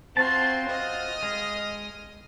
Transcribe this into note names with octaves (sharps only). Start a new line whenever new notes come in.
C4 F4 F#4 A5 C6
D#5 D#6 F6
G#3